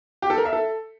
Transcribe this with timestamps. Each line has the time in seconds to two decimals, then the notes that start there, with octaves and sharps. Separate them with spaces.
0.22 G4
0.30 A4
0.38 A#4
0.45 E5
0.53 A4